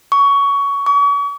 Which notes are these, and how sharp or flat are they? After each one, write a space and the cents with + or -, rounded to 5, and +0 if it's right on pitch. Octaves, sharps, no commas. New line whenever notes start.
C#6 +20
C#6 +40